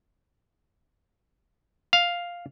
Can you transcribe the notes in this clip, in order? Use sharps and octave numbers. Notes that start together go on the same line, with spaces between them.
F5